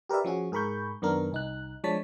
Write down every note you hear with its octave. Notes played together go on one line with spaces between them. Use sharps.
G4 A#4 B4 D5 E5
F3 C#4 F#4 G#4
G#2 G#4 A#4 B5 C#6 G6
F#2 D#3 B3 D4 A#4
C2 D#4 F#6
F3 G#3 D4 C#5 A5 B6